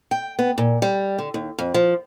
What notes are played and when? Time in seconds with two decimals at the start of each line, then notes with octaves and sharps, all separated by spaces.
0.11 G5
0.39 B3
0.58 A#2
0.82 G3
1.18 D3
1.34 D#2
1.59 F2
1.74 F3